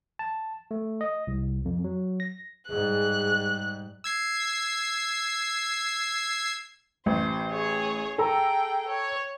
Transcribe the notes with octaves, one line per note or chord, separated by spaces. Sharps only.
A5
A3
D#5
C2
F2
F#3
A#6
G#2 G3 G#4 F#6
E6 G#6 C7
A1 C5
G#4 C#5
G#4 A4 G5 A#5
C#5